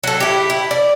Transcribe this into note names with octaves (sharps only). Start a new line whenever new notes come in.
F#3 A4
E4 G4
E4
D5